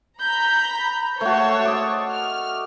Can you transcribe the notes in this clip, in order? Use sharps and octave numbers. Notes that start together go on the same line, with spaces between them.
A#5 B5 G6
A3 F#4 C5 C#5 A5
D5 D#5
F6